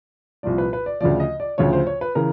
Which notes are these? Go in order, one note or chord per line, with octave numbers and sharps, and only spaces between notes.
C2 A#2 F3 D5
B4
B4
D5
D2 C#3 F3 D5
D#5
D5
D2 C#3 F3 C#5
C5
C#5
B4
C#3 E3 A#4